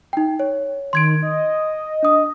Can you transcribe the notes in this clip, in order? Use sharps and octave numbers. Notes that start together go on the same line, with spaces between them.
D#4 G5
C#5
D#3 C6 G#6 D7
D#5
D4 D#6